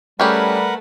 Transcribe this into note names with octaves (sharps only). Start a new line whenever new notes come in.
G3 A3 C#4 G4 G#4 A#4 B4 F#5